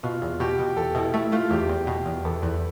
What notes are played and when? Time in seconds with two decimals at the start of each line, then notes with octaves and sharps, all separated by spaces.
0.03 B2 F4
0.22 E2
0.40 B2 G4
0.59 B2
0.76 E2 A4
0.95 B2 E4
1.14 A3 E4
1.32 A3 F4
1.51 E2 G4
1.69 E2
1.87 B2
2.06 E2
2.25 E2 A4
2.42 E2 B4